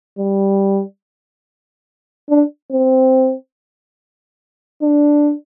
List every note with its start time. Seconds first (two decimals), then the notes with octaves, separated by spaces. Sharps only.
0.19 G3
2.30 D4
2.71 C4
4.82 D4